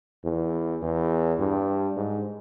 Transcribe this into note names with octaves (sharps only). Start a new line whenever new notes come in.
E2
E2
G2
G#2